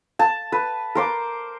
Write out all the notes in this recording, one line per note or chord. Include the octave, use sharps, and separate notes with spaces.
A5
B4
A#4 C5 D6